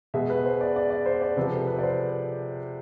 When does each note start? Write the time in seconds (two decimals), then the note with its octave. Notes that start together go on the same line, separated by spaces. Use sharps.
0.14 B2 G#3 E5
0.30 B4
0.46 C5
0.61 D5
0.76 D5
0.90 D5
1.06 C5
1.22 D5
1.36 C3 F3 G#3 B4
1.53 A4
1.67 B4
1.79 D5
1.83 C5